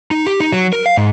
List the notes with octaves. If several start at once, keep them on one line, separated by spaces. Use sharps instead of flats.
D#4
G4
D#4
F#3
A#4
F5
G#2